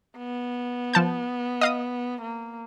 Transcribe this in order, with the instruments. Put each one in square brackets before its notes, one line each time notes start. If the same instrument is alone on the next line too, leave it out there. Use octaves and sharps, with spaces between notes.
[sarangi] B3
[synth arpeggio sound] F3 A5 G6
D#5 F5 D#6
[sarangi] A#3